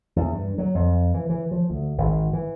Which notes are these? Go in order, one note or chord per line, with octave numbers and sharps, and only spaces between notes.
E2
G2
F#3
F2
E3
E3
F3
D2
G#1
E3